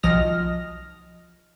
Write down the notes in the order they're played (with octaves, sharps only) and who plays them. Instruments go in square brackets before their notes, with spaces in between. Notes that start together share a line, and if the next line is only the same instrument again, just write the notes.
[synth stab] B1 F3 D#5 F6 A#6